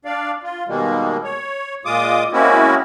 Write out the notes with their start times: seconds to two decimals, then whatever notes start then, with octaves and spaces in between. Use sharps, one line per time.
0.05 D4 D5 F5
0.43 F4
0.68 B2 D#3 G3 G#3 A#3
1.24 C#5
1.85 A#2 G#3 F4 D6 D#6
2.32 G#3 A#3 C4 C#4 E4 F#4